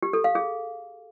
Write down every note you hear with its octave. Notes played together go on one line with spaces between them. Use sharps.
G4
A4
F5
G#4